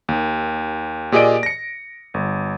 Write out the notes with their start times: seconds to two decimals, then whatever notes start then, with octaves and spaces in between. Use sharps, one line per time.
0.09 D#2
1.12 A#2 G4 G#4 D5 D#5 D7
1.43 A#6 C#7
2.14 G1